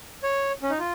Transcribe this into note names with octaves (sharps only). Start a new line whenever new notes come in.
C#5
C#4
D#4
F4